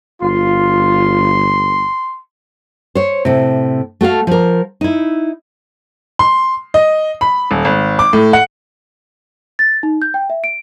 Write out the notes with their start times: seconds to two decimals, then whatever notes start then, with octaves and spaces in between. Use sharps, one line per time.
0.22 G1 F4 C6
2.95 C5 C#5
3.25 A2 C3
4.01 A3 F#4 A4 F5
4.27 F3 A#4
4.81 D#4 E4
6.19 C6
6.74 D#5
7.21 B5
7.51 D#1
7.65 G#1
7.99 D6
8.13 A2
8.33 F#5
9.59 A6
9.83 D#4
10.02 G6
10.14 G5
10.30 E5
10.44 D7